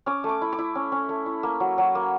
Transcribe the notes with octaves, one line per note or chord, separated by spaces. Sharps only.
C#4 D6
A3
D6
E4
D6
E4
C#4
C#4
A3
E4
A#3
F#3
F#3
A#3